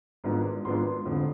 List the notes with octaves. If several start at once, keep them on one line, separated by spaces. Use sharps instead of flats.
G#1 G#2 F3 B3 D4
G#1 G#2 F3 B3 D4 C6
F1 F2 D3